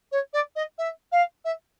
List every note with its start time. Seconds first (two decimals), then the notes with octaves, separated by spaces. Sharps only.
0.12 C#5
0.33 D5
0.56 D#5
0.78 E5
1.12 F5
1.45 E5